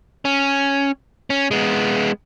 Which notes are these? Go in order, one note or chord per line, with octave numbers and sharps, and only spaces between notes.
C#4
C#4
G#3 B3